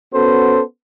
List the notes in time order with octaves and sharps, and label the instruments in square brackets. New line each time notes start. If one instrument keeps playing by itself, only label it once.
[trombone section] B3 C#4 F#4 A4 C5